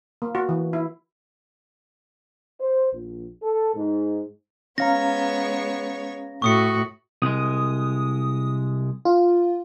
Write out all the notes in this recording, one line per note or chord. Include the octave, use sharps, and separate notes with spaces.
A#3
F#4
E3
E4
C5
A#1
A4
G#2
G#3 B3 C#4 C#5 F5 A#5 A#6
A2 F#4 C#6 D#6 C#7
C2 G#3 D#6
F4